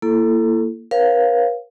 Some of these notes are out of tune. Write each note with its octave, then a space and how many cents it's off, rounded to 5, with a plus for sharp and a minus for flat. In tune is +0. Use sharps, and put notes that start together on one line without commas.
A#3 -10 E4 +30 A4 +0
A#4 +45 C#5 -45 F5 +0